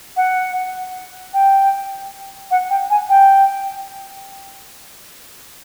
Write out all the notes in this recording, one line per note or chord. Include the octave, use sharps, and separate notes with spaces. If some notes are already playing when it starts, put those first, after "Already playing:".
F#5
G5
F#5
G5
G#5
G5